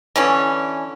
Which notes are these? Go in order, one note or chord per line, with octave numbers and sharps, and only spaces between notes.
D3 E3 C#4